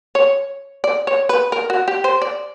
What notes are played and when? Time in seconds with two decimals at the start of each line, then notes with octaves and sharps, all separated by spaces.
0.15 C#5
0.84 D5
1.07 C#5
1.29 B4
1.52 A#4
1.70 F#4
1.88 G4
2.04 C5
2.22 D5